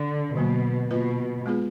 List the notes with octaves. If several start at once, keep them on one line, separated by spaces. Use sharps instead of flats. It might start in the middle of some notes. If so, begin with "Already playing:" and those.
Already playing: D3
B2 D3 F#3 A#3
B2 A#3 F4 B4 D#5
G#3 B3 F4 G#4